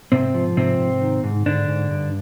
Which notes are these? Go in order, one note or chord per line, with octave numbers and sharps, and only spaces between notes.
G#2 C3 C4
F3
G#2 C3 C4
G#2
D#3
G#2
G#2 D3 D4
G#2
G2